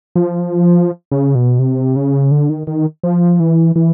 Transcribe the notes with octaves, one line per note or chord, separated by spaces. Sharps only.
F3
C#3
B2
C3
C#3
D3
D#3
D#3
F3
E3
E3